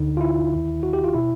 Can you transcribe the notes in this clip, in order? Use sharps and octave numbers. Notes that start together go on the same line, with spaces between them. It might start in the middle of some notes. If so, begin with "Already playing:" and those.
Already playing: D2 D3 D#4
F4
E4
D#2 D#3
F#4
G4
F4
B2 E4